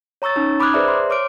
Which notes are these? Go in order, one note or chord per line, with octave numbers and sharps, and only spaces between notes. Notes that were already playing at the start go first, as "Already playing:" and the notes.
C#5 A#5 C#6 E6 A6
C#4 D#4
B5 D6 D#6 F6 F#6 G#6
G#4 B4 C5 D5 E5 A#5
C6
C#5 D6 F6 D7